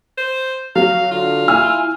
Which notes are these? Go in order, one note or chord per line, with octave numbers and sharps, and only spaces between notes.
C5
F#3 F5
D3 F4
E4 G#5 E6 F6